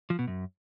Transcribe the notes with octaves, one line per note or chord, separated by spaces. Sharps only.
F3
B2
F#2